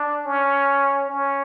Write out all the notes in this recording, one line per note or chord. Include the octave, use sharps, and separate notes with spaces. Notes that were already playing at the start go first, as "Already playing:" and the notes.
Already playing: D4
C#4
C#4